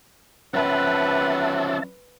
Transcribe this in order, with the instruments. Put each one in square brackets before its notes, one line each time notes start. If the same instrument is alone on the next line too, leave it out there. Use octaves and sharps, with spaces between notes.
[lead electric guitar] F3 C#4 [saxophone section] C4 F#5 [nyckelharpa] B4 [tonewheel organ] E5 A5